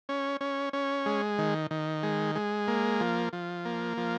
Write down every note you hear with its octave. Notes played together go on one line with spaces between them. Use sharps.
C#4
C#4
C#4
G#3
D#3
D#3
G#3
G#3
A#3
F3
F3
A#3
F3